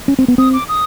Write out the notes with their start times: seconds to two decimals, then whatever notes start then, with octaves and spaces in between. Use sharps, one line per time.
0.08 C#4
0.19 C4
0.28 B3
0.38 C4 D#6
0.53 D6
0.68 D#6